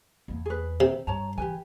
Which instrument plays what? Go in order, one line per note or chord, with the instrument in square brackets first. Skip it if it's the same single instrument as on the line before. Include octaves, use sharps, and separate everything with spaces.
[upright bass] E2 A#3
[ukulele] G#4 B4
[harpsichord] C3
[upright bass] G2 [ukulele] C#5 A5 A#5
[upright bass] E3 [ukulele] G4 B4 G#5